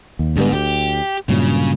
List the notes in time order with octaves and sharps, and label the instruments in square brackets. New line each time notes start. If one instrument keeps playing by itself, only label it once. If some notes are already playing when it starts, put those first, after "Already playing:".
[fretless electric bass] D#2
[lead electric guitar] G#2 [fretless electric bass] D3 G3 B3
[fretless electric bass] D2 [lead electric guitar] G4
[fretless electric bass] G2 A#2 F#3 [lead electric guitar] C#3